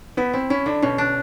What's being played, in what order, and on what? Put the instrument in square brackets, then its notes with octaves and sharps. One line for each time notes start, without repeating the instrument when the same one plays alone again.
[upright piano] B3 [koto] E4
[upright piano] C4 [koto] E4
[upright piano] C#4 [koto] E4
[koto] D3 [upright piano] D4
[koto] B2 [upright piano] C#4
[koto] D4